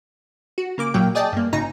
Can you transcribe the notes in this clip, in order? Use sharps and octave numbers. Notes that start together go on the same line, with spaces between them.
F#4
C#3 A#3 D6
A1 A#2 F#3 A#3 G5
G#4 D5 D#5 G5 A5
G2 A#3
G#1 C#3 D#4 A#5